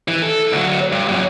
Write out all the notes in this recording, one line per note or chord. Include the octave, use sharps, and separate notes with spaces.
E3
A4
D2 F#3
G2
F#2 A#2